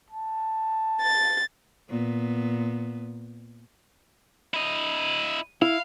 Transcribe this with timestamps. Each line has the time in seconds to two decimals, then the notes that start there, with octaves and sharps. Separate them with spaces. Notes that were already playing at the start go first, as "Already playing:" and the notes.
0.11 A5
1.00 A6
1.90 A#2 B3
4.54 E4 D#5
5.62 E4 F5